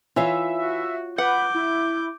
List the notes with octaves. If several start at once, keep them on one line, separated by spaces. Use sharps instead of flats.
E3 F4 C#5 E5 F5
F#4
B4 F#5 D6 G6
E4